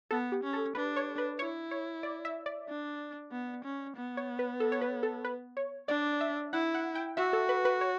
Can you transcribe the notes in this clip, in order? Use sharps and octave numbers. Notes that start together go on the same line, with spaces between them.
B3 A4
G4
C#4
A4
D4 B4
C#5
B4
E4 C#5
C#5
D5
E5
D5
D4
B3
C#4
B3
C#5
B4
A4
C#5
B4
A4
B4
C#5
D4 D5
E5
E4 F#5
F#5
G5
F#4 E5
A4
B4
B4
C#5